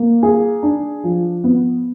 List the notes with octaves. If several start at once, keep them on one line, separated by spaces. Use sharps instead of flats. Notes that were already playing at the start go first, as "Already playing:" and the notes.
Already playing: A#3
G#4
D4
F3
B3